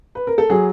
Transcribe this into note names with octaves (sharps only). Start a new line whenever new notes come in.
B4
A#4
A4
F#3 G#4